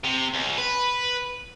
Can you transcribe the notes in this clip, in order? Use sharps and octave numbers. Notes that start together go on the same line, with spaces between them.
C3
C#2
B4